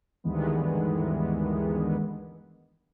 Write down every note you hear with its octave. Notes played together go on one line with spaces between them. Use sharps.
D2 G2 D#3 E3 G#3 B3